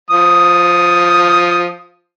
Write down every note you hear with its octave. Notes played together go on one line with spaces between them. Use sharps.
F3 D#6